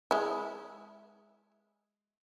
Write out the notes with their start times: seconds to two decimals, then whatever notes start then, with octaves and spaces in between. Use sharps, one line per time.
0.11 G#3 E4